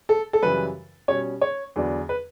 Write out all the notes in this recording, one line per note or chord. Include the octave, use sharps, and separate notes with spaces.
A4
A4
F#2 C#3 E3 G3 B4
B2 G3 C#4 C#5
C#5
E2 D3 F#3 B3 D4
B4